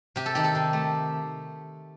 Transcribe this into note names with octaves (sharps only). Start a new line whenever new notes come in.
C3 G4
A4
D#3 G4
A4
C3
A3